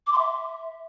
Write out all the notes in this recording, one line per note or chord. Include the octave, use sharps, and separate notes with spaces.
D6
C6
E5